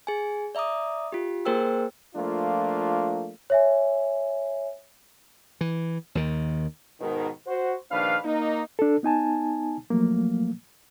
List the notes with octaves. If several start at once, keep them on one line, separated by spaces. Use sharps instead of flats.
G#4 G#5
D5 E5 A#5 D6 D#6
F4 G4
A#3 G#4 A#4 C5 G5 E6
F3 A3 A#3 D4 F4
C#5 E5 G#5
E3
D#2 D#3
G#2 B2 D#3
F#4 C5
A#1 D#3 D4 B4 F5
A#3 D#4
D4 A4
B3 D#4 G#5 A5
F3 F#3 A3 A#3